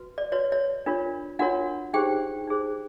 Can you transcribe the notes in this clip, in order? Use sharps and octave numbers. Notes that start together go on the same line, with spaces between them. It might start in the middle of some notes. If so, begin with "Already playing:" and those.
Already playing: F#4 B4
D5
F#4 B4 C#5
C#5
D4 F4 A#4 C#5
D4 F4 F#4 A#4 C#5 F#5
D#4 G4 G#4 C5 G5
D#4 G#4 C5